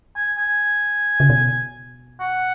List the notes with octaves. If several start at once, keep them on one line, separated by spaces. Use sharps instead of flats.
G#5
G#5
C#3
B2
F#5